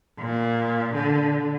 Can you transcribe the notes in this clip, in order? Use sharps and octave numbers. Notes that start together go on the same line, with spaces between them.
A#2
D3